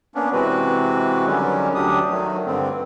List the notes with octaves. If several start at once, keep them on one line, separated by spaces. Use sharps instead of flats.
A#3 B3 C#4 D4
C3 E3 G#3 C4 F#4 B4
D3 D#3 F#3 G3 C#4
D2 F#3 D4 G4 D#6
D#3 F#3 A3
G2 D3 C4